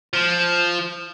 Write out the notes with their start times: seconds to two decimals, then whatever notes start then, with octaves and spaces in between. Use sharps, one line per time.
0.14 F3